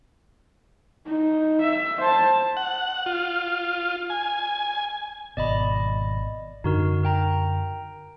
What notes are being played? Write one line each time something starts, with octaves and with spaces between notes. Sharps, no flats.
D#4
E5
C5 A5
F#5
F4
G#5
G#1 B2 D5 D#5 B5
F#2 D3 D4 D#4 F#4 A#4
A#4 G5 A#5